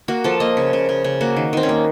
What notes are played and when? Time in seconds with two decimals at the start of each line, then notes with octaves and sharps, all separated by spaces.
0.08 A#3 F#4
0.24 F3 A4
0.40 A#3 D#5
0.57 C#3
0.73 C#3
0.89 C#3
1.04 C#3
1.21 A#3 F#4
1.36 D#3
1.53 D#3 C4
1.63 C#4
1.69 A#3